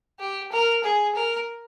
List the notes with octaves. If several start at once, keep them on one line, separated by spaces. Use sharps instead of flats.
G4
A#4
G#4
A#4